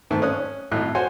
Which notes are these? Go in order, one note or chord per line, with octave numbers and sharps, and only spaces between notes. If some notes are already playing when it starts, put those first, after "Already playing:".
G#2 D#3 A3
C#4 D#6 F#6
G#1 A2 D#4 F#6
F#4 C5 C#5 G#5